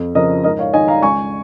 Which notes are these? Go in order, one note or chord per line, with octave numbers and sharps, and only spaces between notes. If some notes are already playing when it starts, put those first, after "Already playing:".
Already playing: F2
C#3 F3 A#4 D#5
G#2 A#4 D#5
C#5 F5
D#3 D#5 G#5
F5 A#5
C#2 G#5 C#6